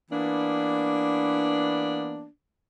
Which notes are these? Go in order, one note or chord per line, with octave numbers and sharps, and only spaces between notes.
E3 A#3 B3 D4